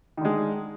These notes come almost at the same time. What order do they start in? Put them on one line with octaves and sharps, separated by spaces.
D#3 D3 G#3